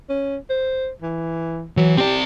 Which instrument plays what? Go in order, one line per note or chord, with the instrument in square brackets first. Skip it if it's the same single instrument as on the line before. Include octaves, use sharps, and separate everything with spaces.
[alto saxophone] C#4
C5
E3
[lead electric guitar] E3 [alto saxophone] F#3
[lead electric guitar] C4 D5 [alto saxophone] G4